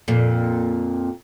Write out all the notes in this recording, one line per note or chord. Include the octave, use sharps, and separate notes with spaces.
F2 A#2